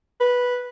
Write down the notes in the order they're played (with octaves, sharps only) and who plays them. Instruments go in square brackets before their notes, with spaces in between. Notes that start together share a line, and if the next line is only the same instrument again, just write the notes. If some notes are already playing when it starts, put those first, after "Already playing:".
[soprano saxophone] B4